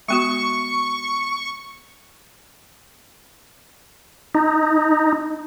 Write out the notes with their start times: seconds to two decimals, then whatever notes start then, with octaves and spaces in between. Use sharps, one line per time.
0.08 G#3 B3 F#4 C#6
4.35 D#4